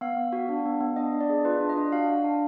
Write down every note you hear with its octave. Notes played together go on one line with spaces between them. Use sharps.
B3 F5
B3
F#4
D4
B3
B3
D4 D#5
D4
D5
G#4
F4 B4
D4
D#5
D4
F#4 F5
D4
D4